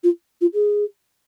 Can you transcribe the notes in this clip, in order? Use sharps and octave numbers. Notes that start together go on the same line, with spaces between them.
F4
F4
G#4